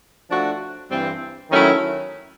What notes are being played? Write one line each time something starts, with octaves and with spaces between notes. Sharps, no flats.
F3 A3 D4 F#4
G2 E3 G3 C4
D#3 F#3 A3 C#4 E4